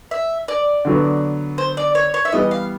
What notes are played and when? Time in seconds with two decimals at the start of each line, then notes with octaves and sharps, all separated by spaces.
0.11 E5
0.48 D5
0.85 D3 F#3 B3
1.58 C5
1.77 D5
1.95 C#5
2.14 C#5
2.25 E5
2.32 E3 G3 B3 D#5
2.51 F5